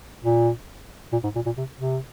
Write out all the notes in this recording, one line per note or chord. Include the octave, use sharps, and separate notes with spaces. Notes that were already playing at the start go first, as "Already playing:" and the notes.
A#2
A#2
G#2
A#2
A#2
C3
C3